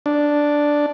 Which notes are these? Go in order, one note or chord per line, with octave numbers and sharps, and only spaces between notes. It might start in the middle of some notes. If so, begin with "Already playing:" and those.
D4